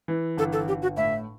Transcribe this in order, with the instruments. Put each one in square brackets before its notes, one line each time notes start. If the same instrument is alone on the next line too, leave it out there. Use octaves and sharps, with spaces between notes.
[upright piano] E3
[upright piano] G1 [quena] A4
[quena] A4
[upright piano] G1 [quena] G4
[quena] F#4
[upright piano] A2 [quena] E5